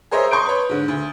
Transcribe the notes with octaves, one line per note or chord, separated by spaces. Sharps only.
G#4 A#4 C5 C#5 D#5 E5
C6 C#6 D#6 G6 D7
B4 C#5
G#2 D3
D2